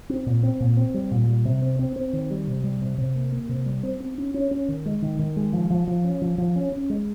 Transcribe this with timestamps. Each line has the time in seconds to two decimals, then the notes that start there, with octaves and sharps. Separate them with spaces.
0.09 C4
0.26 A#2
0.43 C4
0.60 A#2
0.77 C4
0.94 G3
1.11 A#2
1.28 G3
1.45 C3
1.62 C4
1.79 C4
1.96 C4
2.13 D#3
2.30 G3
2.47 C3
2.64 G3
2.81 C3
2.98 C3
3.16 A#3
3.32 A#3
3.49 C3
3.66 G3
3.83 C4
4.00 C4
4.18 C#4
4.34 C#4
4.51 C#4
4.68 D#3
4.86 G#3
5.02 D#3
5.19 D#3
5.37 G#3
5.53 F3
5.70 F3
5.87 F3
6.04 C#4
6.22 F3
6.38 F3
6.56 C#4
6.72 C#4
6.90 G#3